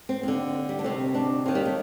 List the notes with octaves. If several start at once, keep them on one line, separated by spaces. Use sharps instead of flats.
C4
D#2 D3 C4
G3
D4
D2 C3 D#3 C4
D4
D#2 D#3 C4
G3
A3